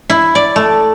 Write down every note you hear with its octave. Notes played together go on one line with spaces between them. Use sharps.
E4
D5
A3